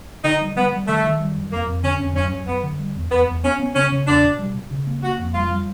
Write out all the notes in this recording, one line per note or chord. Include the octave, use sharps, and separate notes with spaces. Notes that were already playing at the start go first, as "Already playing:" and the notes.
D3 D#4
G3
G3 B3
G3
D#3 A3
D#3
G3
F#2
F2 A#3
F2
D3 C#4
F2
F#2 C#4
F#2
F#2 B3
D3
G3
E2
E2 B3
E2
B3 C#4
B3
C#3 C#4
C#3
E2 D4
B2
G3
B2
C#3
A#3
A#3 F#4
F2
G3 F4
G3